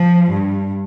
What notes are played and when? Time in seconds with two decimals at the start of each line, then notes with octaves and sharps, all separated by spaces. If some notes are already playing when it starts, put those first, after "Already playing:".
Already playing: F3
0.31 G2